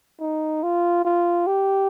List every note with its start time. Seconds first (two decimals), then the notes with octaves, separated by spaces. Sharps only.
0.20 D#4
0.63 F4
1.05 F4
1.47 G4